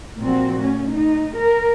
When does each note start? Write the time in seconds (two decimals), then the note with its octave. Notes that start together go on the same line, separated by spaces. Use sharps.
0.21 A#2 F3 C4 F#4
0.60 A3 C#4
0.92 D#4
1.37 A#4